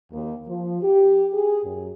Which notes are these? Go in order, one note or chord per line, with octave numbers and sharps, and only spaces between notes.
D#2
F3
G4
G#4
F#2